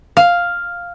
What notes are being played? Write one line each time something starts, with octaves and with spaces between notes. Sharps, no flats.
F5